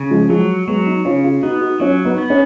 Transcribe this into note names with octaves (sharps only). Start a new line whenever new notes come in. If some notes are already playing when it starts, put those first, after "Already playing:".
Already playing: C#3
F3 G#3
F3 F#3 G#3
F#3 G#3 B3
B3 D#4
C#3 C#4 F4
F4 G#4
B3 D#4 F#4
D#4 F#4
F#3 C#4 F4
B3 D#4
B3
C#4